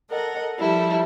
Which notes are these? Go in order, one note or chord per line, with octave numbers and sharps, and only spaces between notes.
A4 A#4 D#5 F#5
F3 G3 E4 A4